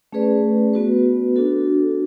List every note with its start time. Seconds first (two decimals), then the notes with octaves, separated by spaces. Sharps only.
0.12 A3 C#4 G#4 B4 D5
0.73 B3 F#4 B4
1.36 D4 F#4 A4